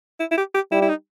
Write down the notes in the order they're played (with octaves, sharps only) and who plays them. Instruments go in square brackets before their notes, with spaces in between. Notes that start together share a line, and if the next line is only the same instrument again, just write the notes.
[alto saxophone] E4
E4
G4
G4
[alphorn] G3 [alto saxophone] E4
[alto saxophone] E4
D#4